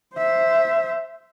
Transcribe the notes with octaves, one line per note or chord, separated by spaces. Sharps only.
C5 E5